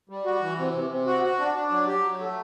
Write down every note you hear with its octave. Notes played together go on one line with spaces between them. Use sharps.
G3
F#4
E3
C3
C3
C3
F#4
F#4
D4
D4
F#3
G4
F#3
A3